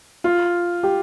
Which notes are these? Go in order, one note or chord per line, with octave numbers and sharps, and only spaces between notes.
F4
G4